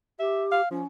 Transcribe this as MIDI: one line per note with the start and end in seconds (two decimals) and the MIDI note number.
0.19 0.61 67
0.19 0.45 76
0.52 0.67 77
0.71 0.83 53
0.71 0.86 61